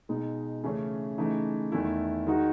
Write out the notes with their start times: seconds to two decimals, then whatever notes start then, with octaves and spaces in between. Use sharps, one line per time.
0.09 B2 G#3 D#4
0.64 C#3 E3 A3 C#4
1.18 C#3 E3 A3 D#4
1.72 E2 D#3 A3 E4
2.27 D#3 G#3 D#4 F#4